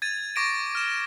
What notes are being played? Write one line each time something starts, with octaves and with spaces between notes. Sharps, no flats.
G#6 A6 D#7
C#6 D6 A#6 D7 D#7
F6 E7